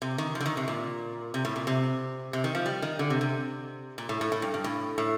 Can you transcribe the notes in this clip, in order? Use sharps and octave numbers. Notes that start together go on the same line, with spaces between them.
C3
D#3
F3
D3
D#3
C3
A#2
C3
A2
A#2
C3
C3
D#3
F3
G3
D#3
D3
C3
C3
A#2
A2
A2
A2
G2
G2
A2
A2